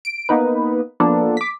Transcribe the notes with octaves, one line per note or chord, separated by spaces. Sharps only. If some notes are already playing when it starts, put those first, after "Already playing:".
D7
A#3 B3 D#4 B4
F3 A#3 B3 D4 A4
D6 B6